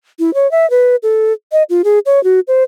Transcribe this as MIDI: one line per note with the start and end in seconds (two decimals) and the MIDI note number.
0.19 0.34 64
0.34 0.50 73
0.51 0.69 76
0.70 0.96 71
1.03 1.33 69
1.52 1.63 75
1.70 1.82 65
1.84 1.99 68
2.06 2.22 73
2.24 2.40 66
2.48 2.63 72